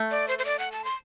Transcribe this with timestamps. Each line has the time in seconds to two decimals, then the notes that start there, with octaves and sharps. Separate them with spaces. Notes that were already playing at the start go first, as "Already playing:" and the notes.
Already playing: A3
0.11 D5
0.28 C5
0.39 C5
0.45 D5
0.59 F#5
0.72 A5
0.84 C6